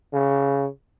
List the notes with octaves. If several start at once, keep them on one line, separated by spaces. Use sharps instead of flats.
C#3